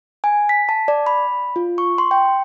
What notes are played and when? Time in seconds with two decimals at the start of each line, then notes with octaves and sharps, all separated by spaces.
0.24 G#5
0.49 B6
0.69 A5
0.88 D5
1.06 B5
1.56 F4
1.78 C#6
1.98 C6
2.11 G5